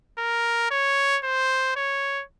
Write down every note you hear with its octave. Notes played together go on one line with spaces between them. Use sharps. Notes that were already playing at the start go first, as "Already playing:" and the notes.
A#4
C#5
C5
C#5